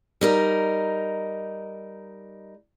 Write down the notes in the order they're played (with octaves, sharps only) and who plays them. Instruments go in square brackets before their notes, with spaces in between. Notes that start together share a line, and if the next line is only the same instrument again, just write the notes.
[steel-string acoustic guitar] G3 D#4 A#4